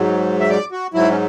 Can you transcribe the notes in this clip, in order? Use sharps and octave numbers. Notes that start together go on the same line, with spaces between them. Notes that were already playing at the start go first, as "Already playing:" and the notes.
Already playing: G#2 F#3
E5
D5
F#4
G#2 F#3 E4
C#4